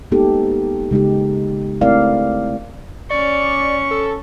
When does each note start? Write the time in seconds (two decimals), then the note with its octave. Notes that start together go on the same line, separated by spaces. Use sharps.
0.12 G#3 A#3 B3 D#4 G4 A4
0.91 C#3 G#3 D#4 G4
1.81 A3 C4 E4 A#4 D5 F5
3.10 C#4 D5 C#6
3.91 A4